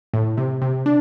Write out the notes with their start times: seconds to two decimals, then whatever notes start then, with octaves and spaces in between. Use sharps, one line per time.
0.14 A2
0.37 C3
0.62 C3
0.86 D4